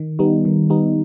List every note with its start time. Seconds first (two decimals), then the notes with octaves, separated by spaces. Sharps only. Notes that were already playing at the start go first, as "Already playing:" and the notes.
Already playing: D#3
0.19 G3 B3 D#4
0.45 D#3
0.70 G3 B3 D#4